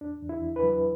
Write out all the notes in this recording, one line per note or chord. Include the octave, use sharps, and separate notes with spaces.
E2 D4
E2
E4
E2
B4
F#3